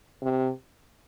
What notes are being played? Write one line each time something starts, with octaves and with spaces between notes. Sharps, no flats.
C3